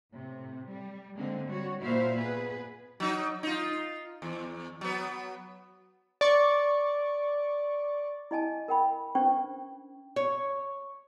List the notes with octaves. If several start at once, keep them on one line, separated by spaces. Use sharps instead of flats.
A2 C3
G3
D3 G#3 A#3 C4
G3 F#4 C#5
A#2 E4 F#4 C5 E5 F5
B3 G#4 B4
F#3 D#4
D#4 F4
E2
F#3 B3
D5 C#6
E4 D#5 G#5 A5
A#4 G5 B5
C#4 D4 B4 C5 G5 C#6
C#5